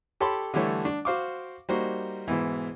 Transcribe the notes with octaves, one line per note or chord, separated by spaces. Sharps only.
G4 A4 C#5 A5 B5 C6
D3 E3 G3 A3 C#5
D4
F#4 C5 F5 C#6 D6
G3 A#3 D#4 F#4 C5
G#2 B2 E3